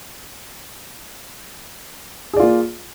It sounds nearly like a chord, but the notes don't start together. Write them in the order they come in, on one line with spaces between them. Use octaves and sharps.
G#4 D5 F4 A#3